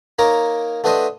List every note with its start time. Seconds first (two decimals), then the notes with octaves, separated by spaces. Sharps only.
0.19 A#3 D#4 A#4 C#5 A#5 D6
0.84 A3 B3 D4 B4 C5 D#5